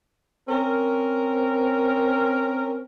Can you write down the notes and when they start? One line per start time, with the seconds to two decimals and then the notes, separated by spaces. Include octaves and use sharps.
0.49 C4 C#4 A#4